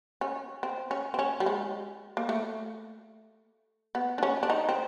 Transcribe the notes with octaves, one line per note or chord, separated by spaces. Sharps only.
C#4
C4
C#4
C4
C#4
G3
G#3
A#3
A3
B3
D4
C#4
D4
D#4
C4